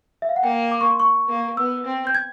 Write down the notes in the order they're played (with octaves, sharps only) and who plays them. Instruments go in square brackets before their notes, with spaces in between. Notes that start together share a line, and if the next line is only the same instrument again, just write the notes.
[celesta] E5
F5
F#5
[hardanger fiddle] A#3 [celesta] G5
[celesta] D6
C#6
C6
C#6
[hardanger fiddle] A#3
[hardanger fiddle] B3 [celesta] E6
[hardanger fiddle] C4
[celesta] G6
G#6